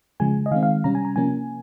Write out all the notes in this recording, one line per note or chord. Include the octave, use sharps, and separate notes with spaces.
C#3 F3 G#3 G#5
D#5
D#3 G#3 C4 F5
F5
C3 G3 C#4 A#5
G#5
A#5
C3 F3 A#3 C#4 G#5